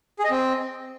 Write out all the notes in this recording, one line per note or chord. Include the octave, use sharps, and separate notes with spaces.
G#4
D#5
C4